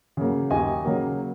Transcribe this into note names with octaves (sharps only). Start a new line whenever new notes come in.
C#3 F#3 A#3
D#2 D#5 G#5
C#3 F#3 A#3